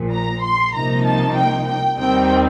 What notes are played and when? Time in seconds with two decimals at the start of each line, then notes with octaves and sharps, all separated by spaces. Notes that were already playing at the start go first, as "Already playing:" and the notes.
Already playing: A#1 A#2 F3
0.12 A#5
0.43 C6
0.73 C2 C3 F3 A#3 D#4 A#5
1.05 A5
1.36 G5
1.67 G5
1.98 D#2 D#3 G3 C4 D#4 G5